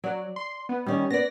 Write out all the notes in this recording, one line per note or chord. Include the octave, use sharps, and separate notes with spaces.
F#3 D5
C6
B3
D#3 G3 C#4
B3 D5 A#6